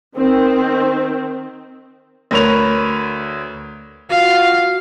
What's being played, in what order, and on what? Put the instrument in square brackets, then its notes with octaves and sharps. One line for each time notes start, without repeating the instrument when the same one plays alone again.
[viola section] D#3 C4
[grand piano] D2 A#4 B4 C#5 F7
[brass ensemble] F4 F#4 [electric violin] F5